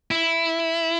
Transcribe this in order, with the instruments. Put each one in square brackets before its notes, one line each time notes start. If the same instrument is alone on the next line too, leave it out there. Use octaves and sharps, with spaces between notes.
[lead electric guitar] E4